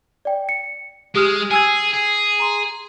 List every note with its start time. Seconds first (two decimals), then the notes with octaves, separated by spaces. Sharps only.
0.25 D5 G5
0.49 C#7
1.15 G#3 G4 D#6 F6
1.51 G#4 G#5 E6 G#6
1.94 G#4
2.40 A#5 C6